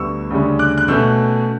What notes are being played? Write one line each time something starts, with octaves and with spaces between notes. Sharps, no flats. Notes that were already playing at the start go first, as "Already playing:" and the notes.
Already playing: D2 D3 G3 B3 C#6 E6
D2 C#3 G3 C#4
D6 F#6
F#6
B2 A3 C#4 E6 G6